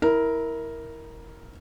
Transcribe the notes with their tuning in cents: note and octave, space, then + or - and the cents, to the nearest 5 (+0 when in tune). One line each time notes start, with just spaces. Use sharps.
E4 -20 A#4 +0